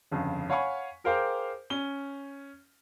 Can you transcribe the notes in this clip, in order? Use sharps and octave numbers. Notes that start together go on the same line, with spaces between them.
G1 F2 C#3
C#5 F5 F#5 G#5 B5 C#6
G#4 A#4 C5 F5 G5 D6
C#4 G7